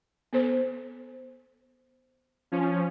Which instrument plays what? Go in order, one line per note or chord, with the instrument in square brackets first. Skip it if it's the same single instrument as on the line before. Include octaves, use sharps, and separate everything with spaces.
[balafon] B3 A4 C5
[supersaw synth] F3 C#4